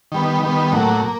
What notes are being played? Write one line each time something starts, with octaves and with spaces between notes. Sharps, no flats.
D#3 G3 B3
D#3 G3 B3
A2 F#3 A#3
A#3